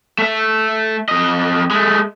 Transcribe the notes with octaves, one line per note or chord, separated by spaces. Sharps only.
A3 E5
F2 D#5
G#3 A3